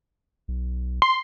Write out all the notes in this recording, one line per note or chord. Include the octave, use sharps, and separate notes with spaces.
B1
C6